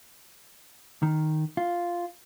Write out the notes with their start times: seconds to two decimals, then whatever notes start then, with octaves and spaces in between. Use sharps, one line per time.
1.03 D#3
1.57 F4